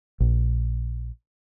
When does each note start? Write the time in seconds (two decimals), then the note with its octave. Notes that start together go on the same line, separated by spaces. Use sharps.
0.20 A#1